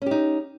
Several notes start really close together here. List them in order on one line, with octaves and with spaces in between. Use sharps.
C#4 G4 D#4